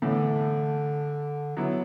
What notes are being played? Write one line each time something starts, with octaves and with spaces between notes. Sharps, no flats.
A2 D3 E3 A3
D3 F#3 B3 E4